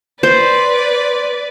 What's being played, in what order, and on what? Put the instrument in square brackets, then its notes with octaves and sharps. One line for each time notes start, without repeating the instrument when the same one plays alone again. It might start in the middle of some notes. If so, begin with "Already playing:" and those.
[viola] B4 D5 [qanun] C5